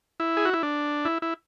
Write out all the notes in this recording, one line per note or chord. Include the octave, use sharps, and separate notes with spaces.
E4
G#4
F#4
E4
D4
E4
E4